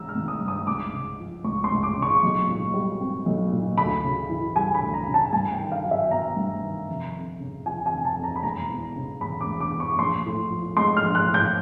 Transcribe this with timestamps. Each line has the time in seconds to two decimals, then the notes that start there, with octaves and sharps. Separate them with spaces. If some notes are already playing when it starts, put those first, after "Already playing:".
Already playing: D#3 G#3 A#5 E6
0.09 F6
0.15 G#1
0.28 D#6
0.41 G2
0.48 D#6
0.67 C#2 D6
0.93 C#3
1.19 F3
1.44 C#2 C#6
1.64 C6
1.71 C#2
1.83 D6
1.97 C#3
2.02 C#6
2.23 B1
2.49 A#2
2.74 G3
3.01 C4
3.26 B1
3.52 A#2
3.78 D2 B5
4.04 C#3
4.29 E3
4.56 G3 G#5
4.75 B5
4.81 D2
4.94 A#5
5.07 C#3
5.14 A5
5.33 G2 G#5
5.52 G5
5.60 D#3
5.72 F5
5.84 F#3
5.91 E5
6.11 B3 A#5
6.37 G2
6.63 D#3
6.88 F1
7.15 F2
7.40 C#3
7.66 F3 G#5
7.86 G#5
7.91 F1
8.05 A5
8.17 F2
8.24 A#5
8.36 B5
8.43 E1 A#5
8.69 E2
8.96 C#3
9.21 E1 B5
9.41 D6
9.47 E1
9.60 D6
9.74 E2
9.80 C#6
9.98 A#1 C6
10.25 A2
10.51 F3
10.77 G#3 C6
10.97 F6
11.03 A#1
11.15 F#6
11.28 A2
11.34 G6